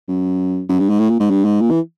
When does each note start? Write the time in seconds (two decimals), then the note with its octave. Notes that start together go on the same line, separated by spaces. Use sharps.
0.08 F#2
0.69 F#2
0.80 G2
0.89 G#2
1.00 A2
1.10 A#2
1.20 G#2
1.31 G2
1.45 G#2
1.61 A#2
1.71 E3